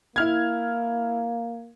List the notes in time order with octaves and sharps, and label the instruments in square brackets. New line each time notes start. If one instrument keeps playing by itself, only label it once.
[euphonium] A#3 [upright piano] E4 F6 G#6